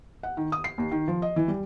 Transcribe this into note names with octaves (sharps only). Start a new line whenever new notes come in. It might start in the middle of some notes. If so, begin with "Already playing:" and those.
F#5
D#3
D#6
C7
D#2
D#3
F3
D#5
E3
G3